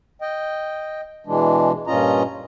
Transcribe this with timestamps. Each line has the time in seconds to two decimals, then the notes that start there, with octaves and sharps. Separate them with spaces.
0.22 D#5 G5
1.26 B2 E3 G#3 D4
1.87 G2 A#2 C#4 F4 D#5 A#5